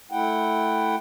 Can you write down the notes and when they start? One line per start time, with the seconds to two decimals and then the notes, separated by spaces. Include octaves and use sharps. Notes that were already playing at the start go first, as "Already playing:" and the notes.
0.11 A3 E4 F#5 G5